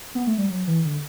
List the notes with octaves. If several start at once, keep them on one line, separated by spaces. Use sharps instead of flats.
B3
A3
G3
F#3
E3
D3